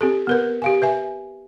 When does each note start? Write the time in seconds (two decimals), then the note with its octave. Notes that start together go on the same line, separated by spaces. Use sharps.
0.01 C4 G4 A4
0.27 B3 A#4 B4
0.62 G4 F5 G#5
0.82 B4 E5 G#5